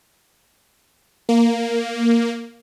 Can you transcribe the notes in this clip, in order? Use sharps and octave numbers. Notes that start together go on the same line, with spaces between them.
A#3